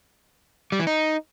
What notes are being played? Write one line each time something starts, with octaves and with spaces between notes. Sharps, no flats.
G3
E3
D#4